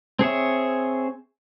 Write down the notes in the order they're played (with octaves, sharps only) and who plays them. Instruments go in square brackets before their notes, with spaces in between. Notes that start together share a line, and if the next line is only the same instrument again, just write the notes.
[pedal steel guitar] C4 G#4 C#5 E5